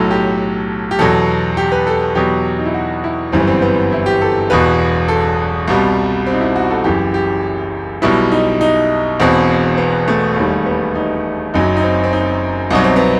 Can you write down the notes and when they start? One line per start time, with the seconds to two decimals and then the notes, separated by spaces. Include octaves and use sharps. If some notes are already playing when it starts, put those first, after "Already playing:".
Already playing: B1 A2 F#3 A4
0.11 G4
0.91 G4
0.99 E2 B2 F#3 A4
1.57 G4
1.72 B4
1.87 A4
2.15 E2 B2 F#3 G4
2.58 D#4
2.66 E4
2.74 F#4
3.04 E4
3.32 G1 F#2 E3 G3 C4
3.40 B3
3.47 C4
3.62 B3
3.92 E4
4.06 G4
4.21 A4
4.50 E1 E2 B2 B4
5.08 A4
5.68 C2 B2 G3
6.27 C4
6.33 D#4
6.41 E4
6.56 F#4
6.70 A4
6.84 F#1 F#2 E3 G4
7.14 G4
8.02 B1 B2 G3 E4
8.32 D#4
8.61 D#4
9.20 E1 E2 B2 C4
9.78 B3
10.08 A3
10.36 E1 D#2 D#3 G3
10.66 B3
10.95 D#4
11.54 F#1 F#2 F#3 D#4
11.77 D#4
11.83 C4
12.04 C4
12.13 D#4
12.71 C2 B2 F#3 D#4
12.84 C4
12.96 B3